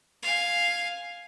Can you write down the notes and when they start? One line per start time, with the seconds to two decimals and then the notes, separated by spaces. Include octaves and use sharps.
0.22 F5 G#5